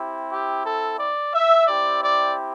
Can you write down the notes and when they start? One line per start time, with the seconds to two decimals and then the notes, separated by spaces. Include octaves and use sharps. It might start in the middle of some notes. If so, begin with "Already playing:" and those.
Already playing: C4 E4 G4
0.31 G4
0.65 A4
0.99 D5
1.34 E5
1.68 C4 E4 G4 D5
2.02 D5